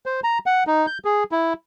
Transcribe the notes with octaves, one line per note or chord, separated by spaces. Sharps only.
C5
A#5
F#5
D#4
G6
G#4
E4